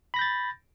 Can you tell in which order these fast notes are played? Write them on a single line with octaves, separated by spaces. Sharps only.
B5 A#6 G6 A6